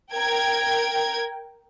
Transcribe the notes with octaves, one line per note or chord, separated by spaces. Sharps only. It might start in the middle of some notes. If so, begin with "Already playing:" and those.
A#4 G5 G#6